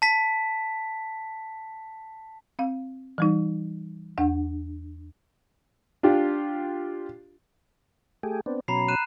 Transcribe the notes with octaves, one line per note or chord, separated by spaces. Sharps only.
A5 B6
C4 F5
E3 G3 D#4
E2 D4 F#5
D4 F4 G4
A3 G4 G#4
B3 C4 D4
B2 F#3 C#4 A#5 B5 C7
F#6 D#7 E7